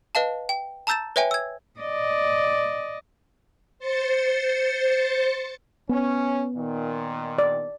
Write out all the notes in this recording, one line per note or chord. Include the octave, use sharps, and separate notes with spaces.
B4 D#5 F5 A5
G5
A5 A#5 E6 G6 A6 E7
B4 C#5 E5 G5 G#5
E6 G#6
D5 D#5
C5 A6 C#7
B3 C#4
A#2 D#3
D5